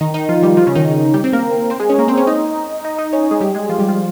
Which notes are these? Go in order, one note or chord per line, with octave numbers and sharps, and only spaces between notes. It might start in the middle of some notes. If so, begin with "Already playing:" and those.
D#3 D#4
D#3 D#4
F3 F4
G3 G4
F3 F4
C#3 C#4
D#3 D#4
G3 G4
C4
A#3 A#4
C4 C5
G#3 G#4
C#4 C#5
A#3 A#4
C4 C5
C#4 C#5
D#4 D#5
D#4 D#5
D#4 D#5
C#4 C#5
G#3 G#4
G3 G4
G#3 G#4
F3 F4
G3 G4
F3 F4